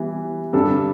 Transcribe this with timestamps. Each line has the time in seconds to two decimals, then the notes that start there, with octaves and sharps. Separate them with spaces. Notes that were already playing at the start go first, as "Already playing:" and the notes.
Already playing: E3 G3 B3
0.53 G2 D3 G3 D4 A4